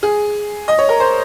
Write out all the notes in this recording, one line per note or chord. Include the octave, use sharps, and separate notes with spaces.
G#4
D#5
C#5
A#4
C5